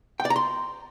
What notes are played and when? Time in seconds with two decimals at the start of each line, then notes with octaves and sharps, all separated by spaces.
0.20 G5
0.25 D5
0.30 A#5
0.36 C6